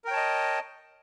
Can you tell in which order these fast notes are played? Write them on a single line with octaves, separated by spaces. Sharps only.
A#4 G5 C#5 A5 D#5